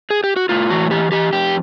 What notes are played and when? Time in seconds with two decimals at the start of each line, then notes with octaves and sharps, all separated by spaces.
0.10 G#4
0.24 G4
0.36 F#4
0.49 A2 F4
0.70 E3 F#4
0.91 E3 G4
1.12 E3 G4
1.33 F2 G4